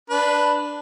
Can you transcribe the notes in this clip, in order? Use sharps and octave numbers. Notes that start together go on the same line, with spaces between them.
D4 B4